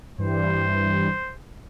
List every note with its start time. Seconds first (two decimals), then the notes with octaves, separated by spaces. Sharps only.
0.18 G2 E3 G3 C5